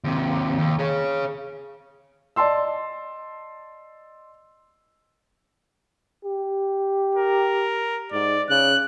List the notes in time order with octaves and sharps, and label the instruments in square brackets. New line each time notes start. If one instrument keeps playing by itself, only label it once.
[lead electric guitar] D#2 C3
D#2
G#4 C#5
[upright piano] D5 D#5 A5 C6 E6
[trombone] G4
[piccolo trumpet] A#4
[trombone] G#2 [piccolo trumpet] D5
[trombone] C#3 [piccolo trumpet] F#6